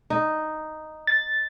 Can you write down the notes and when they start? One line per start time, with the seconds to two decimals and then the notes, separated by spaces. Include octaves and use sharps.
0.10 D#4
1.07 A6